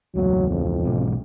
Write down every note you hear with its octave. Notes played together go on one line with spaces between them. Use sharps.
E1 C#2 F#3
F2
B1 G#2